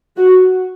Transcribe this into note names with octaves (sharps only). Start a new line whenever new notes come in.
F#4